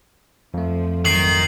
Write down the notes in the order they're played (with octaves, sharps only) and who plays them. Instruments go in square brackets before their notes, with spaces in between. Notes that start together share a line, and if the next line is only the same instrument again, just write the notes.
[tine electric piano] F2 A3 [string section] F3
[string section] G#1 F#3 [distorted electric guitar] D#3 [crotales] C7 F#7